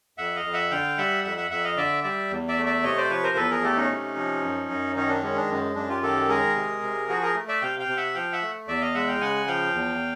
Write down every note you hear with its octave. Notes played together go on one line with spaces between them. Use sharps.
F2 E5 F#5
D#5 F5
F2
E5 F#5
D3 F5 G5
G3 E5 F#5
F2 E5 F#5
E5 F#5
F2 E5 F#5
D#5 F5
D3 D5 E5
G3 D5 E5
E2
D5 E5
A3
D5 E5
C3 C#5 D#5
C5 D5
F3 B4 C#5
A#4 C5
E2 A4 B4
G#4 A#4
A3 G4 A4
C#4 D#4
C3
F3
F#2
F#2
D#3 C#4 D#4
D4
G#3 C#4
D4
F#2
F#2 D4
F4 G4
D#3 G4 A4
G#3 G#4 A#4
C3
C3
F3 F#4 G#4
G#4 A#4
A3
D5 E5
C3 F5 G5
F5 G5
C3
E5 F#5
F3 F5 G5
E5 F#5
A3
E2 D5 E5
D#5 F5
G#3 E5 F#5
F5 G5
C#3 F#5 G#5
F3 F5 G5
E2